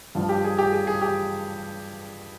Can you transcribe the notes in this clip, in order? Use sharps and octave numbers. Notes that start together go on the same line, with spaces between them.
G2 F3
G4
G#4
G4
G#4
G#4
G4